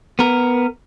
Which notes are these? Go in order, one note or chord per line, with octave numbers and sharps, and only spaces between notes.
B3 A#4